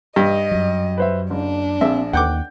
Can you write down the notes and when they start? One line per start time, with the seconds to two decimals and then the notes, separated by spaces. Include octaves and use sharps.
0.16 G2 D#5
0.51 F#2 F#3
0.98 B4 C5 E5
1.30 F#1 D4
1.81 A#1 C4 E5
2.13 D#2 F#5 G5 D6 G6